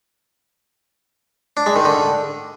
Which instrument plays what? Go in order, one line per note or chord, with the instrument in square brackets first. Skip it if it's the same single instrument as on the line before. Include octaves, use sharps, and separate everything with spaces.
[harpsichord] D4
G#3
D#3
D3